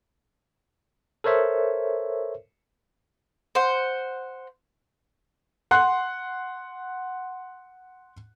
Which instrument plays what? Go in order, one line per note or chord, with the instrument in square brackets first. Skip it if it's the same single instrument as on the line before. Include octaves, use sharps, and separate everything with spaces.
[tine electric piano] A4 A#4 C5 C#5 E5
[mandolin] C5 F#5
[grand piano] F#5 C6 F#6